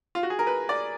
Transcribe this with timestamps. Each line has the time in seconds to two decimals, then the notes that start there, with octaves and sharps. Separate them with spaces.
0.15 F4
0.23 F#4
0.30 G#4
0.39 A#4
0.47 B4
0.69 D5